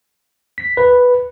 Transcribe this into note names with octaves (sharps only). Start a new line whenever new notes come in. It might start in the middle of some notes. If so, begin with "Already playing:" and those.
B6
B4